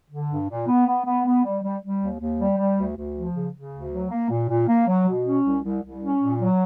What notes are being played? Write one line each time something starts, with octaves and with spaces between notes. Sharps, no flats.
D3
G2
A#2
B3
B3
B3
B3
G3
G3
G3
D#2
D#2
G3
G3
D2
D2
F3
C#3
C#3
D2
F#3
A#3
A#2
A#2
A#3
F#3
B2
C#4
C2
C2
C2
C#4
A#2
F#3